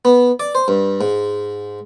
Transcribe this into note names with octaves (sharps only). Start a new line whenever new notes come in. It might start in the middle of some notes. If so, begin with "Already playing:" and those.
B3
D5
C5
G2
G#2